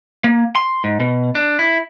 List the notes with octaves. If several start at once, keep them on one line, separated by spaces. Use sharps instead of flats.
A#3
C6
G#2
B2
D4
E4